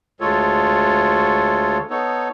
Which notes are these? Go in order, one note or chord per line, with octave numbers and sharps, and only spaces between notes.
D2 G#3 F4 A4 C#5
B3 D#4 A4 C#5